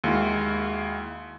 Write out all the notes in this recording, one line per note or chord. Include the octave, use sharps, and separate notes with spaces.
D#2 G#3 E4 F#4 F6